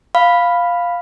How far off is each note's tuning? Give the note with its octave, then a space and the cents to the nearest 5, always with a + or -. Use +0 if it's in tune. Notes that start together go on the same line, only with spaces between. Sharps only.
F5 +0 B5 +0